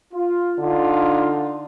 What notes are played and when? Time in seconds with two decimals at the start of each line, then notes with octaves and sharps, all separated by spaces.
0.14 F4
0.59 D3 D4 D#4 F4